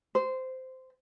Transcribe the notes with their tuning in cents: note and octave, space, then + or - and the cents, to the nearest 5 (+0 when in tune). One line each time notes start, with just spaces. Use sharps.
C5 -15